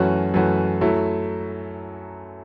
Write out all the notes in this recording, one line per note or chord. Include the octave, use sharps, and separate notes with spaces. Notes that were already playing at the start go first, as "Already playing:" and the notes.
Already playing: F#2 E3 A3 C#4 F#4
F#2 E3 A3 C#4 F#4
F#2 F#3 A3 E4